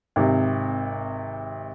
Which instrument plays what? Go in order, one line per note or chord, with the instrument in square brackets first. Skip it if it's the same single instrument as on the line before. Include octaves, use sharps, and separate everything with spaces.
[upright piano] G#1 C3